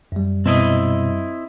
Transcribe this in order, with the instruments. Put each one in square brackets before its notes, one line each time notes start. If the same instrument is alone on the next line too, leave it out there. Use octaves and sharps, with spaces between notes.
[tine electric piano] F#2 G3
[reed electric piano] B2 [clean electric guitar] C4 E4 D#5